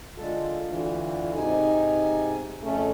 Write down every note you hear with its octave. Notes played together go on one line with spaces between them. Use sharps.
D3 G#3 F4 A4
D2 D3 E3
G#2 C3 D#4 G#5
F2 C#3 A3 C#4